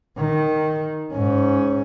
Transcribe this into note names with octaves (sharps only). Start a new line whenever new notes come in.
D#3
G#2 C#4